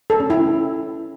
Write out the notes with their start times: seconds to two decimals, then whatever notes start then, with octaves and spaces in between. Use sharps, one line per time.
0.10 A4
0.20 C#4
0.30 E4